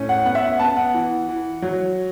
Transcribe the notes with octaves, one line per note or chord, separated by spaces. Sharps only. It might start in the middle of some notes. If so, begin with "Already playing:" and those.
Already playing: A2 C#4
F#5
B3 F#5
E5
F#5
B3 A5
F#5
E3
E3
F#3